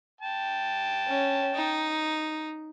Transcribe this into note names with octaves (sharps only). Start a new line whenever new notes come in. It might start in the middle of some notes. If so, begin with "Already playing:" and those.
G5 A5
C#4
D#4